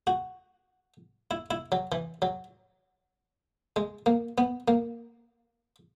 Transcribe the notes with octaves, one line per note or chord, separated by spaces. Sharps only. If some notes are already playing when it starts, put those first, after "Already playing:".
F#4
E4
E4
F#3
E3
F#3
G#3
A#3
B3
A#3